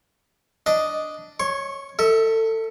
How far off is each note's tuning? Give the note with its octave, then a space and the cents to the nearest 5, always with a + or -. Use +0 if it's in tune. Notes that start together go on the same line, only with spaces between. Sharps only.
D4 +0 D#5 +0
C#5 +0 C#6 -45
A4 +25 E5 -30